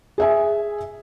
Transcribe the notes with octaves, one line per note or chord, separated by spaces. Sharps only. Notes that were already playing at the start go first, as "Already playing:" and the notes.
G#4 E5 G#5